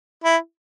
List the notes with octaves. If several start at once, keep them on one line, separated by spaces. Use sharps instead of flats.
E4